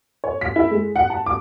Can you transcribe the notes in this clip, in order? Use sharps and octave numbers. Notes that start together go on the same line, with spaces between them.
C#5
B6
E4
G#3
F#5
A5
D6